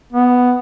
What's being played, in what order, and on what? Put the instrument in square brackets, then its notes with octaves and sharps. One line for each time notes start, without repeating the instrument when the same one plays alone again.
[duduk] B3